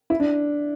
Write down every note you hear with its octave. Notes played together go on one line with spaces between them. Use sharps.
E4
D4